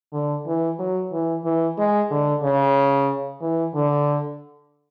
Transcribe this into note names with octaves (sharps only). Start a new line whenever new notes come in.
D3
E3
F#3
E3
E3
G#3
D3
C#3
E3
D3